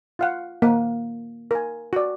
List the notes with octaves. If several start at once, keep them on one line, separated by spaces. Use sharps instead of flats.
F4 F5 F#5
A#3 F#5
A#4 G#5
F#4 D5